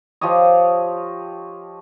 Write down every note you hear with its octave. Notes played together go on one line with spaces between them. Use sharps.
F3 G4 C#5 D#5